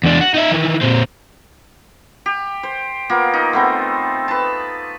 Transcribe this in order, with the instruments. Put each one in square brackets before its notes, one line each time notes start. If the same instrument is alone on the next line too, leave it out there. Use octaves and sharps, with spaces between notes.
[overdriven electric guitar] E2 D4
F#4
D#4 E5
D#3 E3
A#2 C4
[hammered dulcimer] G4
C5
A#3 B3 F4
D#4
A3 B3 C4
B4 A5